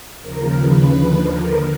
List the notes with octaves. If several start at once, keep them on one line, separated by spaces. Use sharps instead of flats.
D#2 C#3 F3 A#4
B4
D#2 D3 F3
A#4